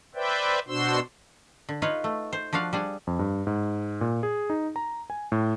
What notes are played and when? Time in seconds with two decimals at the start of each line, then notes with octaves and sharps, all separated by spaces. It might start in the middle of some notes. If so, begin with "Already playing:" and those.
0.15 B4 C5 D5 E5 G5
0.68 B2 D4 F#4 C5 C6 E6
1.69 D3
1.82 D#4 F4 B4 C#5
2.04 A3
2.33 C5
2.53 F3 D4 F#4 F5
2.73 G3 D4 G#4
3.07 F2
3.19 G2
3.47 G#2
4.01 A#2
4.23 G#4
4.50 D#4
4.76 A#5
5.10 G#5
5.32 A2